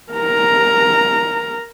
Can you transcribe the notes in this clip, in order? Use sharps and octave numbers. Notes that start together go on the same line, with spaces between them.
A#4 A#5